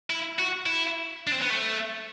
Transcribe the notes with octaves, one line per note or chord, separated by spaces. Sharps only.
E4
F#4
E4
D4
C4
B3
A3